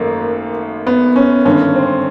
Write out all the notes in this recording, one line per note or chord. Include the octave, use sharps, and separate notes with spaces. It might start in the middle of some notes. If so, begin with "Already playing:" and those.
Already playing: G#1 F#2 A3 A#3
B3
C#4
G#1 G2 D3 C#4
C4